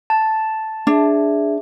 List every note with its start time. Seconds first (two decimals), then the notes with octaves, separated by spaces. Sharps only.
0.10 A5
0.87 D4 G#4 E5